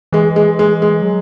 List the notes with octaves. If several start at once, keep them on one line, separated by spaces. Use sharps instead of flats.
E3 G#3
G#3
G#3
G#3
F#3